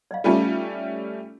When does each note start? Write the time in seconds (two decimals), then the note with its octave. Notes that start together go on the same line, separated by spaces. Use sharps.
0.11 D5 D#5 F5
0.24 G3 A3 C#4 D#4 F4 F#4